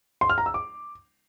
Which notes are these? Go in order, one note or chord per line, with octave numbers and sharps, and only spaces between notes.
C6
F6
A#5
E6
D6